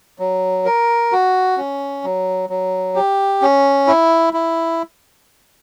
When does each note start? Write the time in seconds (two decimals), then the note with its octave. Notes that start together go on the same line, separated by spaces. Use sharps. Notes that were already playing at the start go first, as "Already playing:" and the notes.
0.19 F#3
0.65 A#4
1.12 F#4
1.57 C#4
2.04 F#3
2.50 F#3
2.95 G4
3.42 C#4
3.87 E4
4.33 E4